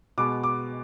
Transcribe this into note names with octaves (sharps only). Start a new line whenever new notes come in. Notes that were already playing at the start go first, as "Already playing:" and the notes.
B2 G#3 B3 D6
D6